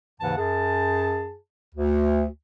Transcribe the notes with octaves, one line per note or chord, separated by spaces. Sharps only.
D#2 G#2 C#3 E3 F#5 A5
F#2 G#4 A5
D2